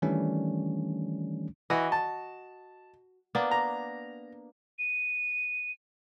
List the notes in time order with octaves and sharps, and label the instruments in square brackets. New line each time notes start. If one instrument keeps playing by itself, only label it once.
[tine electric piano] D#3 E3 G3 A3 C#4 D4
[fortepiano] E3 [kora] F#4 D#5
[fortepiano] A5
[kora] A#3 B3 D4
[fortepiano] A#5
[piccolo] D#7